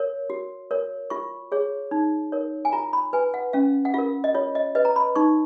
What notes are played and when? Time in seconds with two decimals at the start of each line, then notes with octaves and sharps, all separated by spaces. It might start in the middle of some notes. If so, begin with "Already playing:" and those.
Already playing: A#4 C#5
0.30 F#4
0.71 A#4 C#5
1.10 F4 C#6
1.52 G#4 C#5
1.91 D#4
2.32 A#4 C#5
2.65 G#5
2.72 F4 A#5
2.93 B5
3.13 B4 G#5
3.34 F#5
3.53 C#4 F5
3.85 F#5
3.94 F4 A#4 F5
4.24 D#5
4.34 F4 C#5
4.55 D#5
4.75 B4 D#5
4.85 A#5
4.96 B5
5.16 D#4 C#6